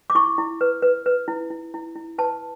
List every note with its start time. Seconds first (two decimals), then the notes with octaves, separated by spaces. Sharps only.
0.10 D6
0.15 E4 C#6
0.38 E4
0.61 B4
0.82 B4
1.06 B4
1.28 E4
1.50 E4
1.74 E4
1.95 E4
2.18 B4 A5